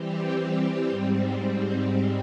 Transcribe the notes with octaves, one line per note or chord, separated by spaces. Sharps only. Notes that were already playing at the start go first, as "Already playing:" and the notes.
Already playing: E3 G3 C4 G4
G#2 G3 C4